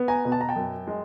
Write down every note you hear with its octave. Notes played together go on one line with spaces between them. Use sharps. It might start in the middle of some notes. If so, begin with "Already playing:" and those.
Already playing: B3
G#5 A#5
B2
A5
A#5
G5 A5
F#2
G#3